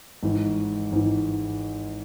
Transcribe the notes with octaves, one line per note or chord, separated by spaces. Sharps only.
G#1 G#2 E3
G#1 G#2 E3